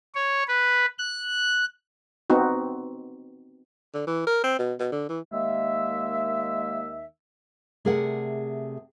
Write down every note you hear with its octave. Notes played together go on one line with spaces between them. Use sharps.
C#5
B4
F#6
B3 C4 D#4 F#4
D3
E3
A#4
C4
B2
B2
D3
E3
D#2 D#3 G#3 A#3 E5
C3 A3 G#4 A#4 D5 F#5